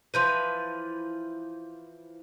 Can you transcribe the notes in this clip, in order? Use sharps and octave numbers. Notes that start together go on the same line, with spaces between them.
E3 F3 B4 C6 G6 D#7